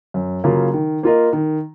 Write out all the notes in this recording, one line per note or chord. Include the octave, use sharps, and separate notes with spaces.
F#2
C#3 F#3 A#3 F4
D#3
A#3 F4 A#4 D#5
D#3